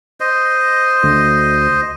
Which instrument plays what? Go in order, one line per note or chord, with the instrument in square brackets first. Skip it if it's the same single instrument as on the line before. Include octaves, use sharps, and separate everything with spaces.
[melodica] C5 D#5
[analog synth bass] D2